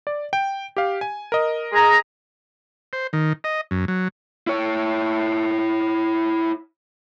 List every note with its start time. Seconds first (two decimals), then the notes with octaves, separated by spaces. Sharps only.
0.07 D5
0.33 G5
0.77 G4 F5
1.01 G#5
1.32 A#4 D#5
1.73 G#4 A#5
2.93 C5
3.13 D#3
3.44 D#5
3.71 F#2
3.88 F#3
4.47 E4 C#5